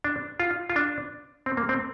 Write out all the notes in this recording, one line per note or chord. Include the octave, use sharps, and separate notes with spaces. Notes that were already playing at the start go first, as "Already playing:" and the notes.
D4
F4
F4
D4
C4
A#3
C4